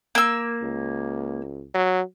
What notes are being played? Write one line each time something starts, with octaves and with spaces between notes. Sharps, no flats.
A#3 E6
C#2
F#3